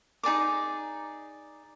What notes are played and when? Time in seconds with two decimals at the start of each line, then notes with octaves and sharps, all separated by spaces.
0.23 D#4 G#4 D5 D6